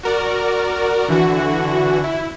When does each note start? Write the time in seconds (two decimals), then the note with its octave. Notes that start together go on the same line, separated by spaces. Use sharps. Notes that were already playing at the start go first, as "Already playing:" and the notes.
0.03 F#4 A#4 D5
1.08 D3 E3 F#4
2.04 E4